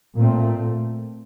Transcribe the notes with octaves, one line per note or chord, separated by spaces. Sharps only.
A#2 A3 C4